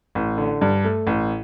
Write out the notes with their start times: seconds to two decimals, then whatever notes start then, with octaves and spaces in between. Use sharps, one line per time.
0.15 A1
0.38 D3
0.61 G2
0.85 A3
1.07 A1